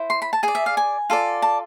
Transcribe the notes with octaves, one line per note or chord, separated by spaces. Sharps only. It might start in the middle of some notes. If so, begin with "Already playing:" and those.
Already playing: E4 C5
C6
B5
A5
G#4 D5 G#5
E5
F5
G#5
F4 A4 D5
A5